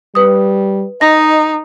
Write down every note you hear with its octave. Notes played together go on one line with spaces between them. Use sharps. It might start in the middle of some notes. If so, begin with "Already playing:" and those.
G3 B4 D#6
D#4 D#5 A#6